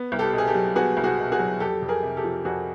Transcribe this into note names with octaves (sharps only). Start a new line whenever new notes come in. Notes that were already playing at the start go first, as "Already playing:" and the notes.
Already playing: B3
C2
G4 A4
B2
G#4
G4 A4
F#3
B3 F#4 G#4
C2
F#4 G#4
B2
F#4 G#4
F#3
F2 G4 A4
F2
G#4 A#4
C3
G4 A4
F3
F2 F#4 G#4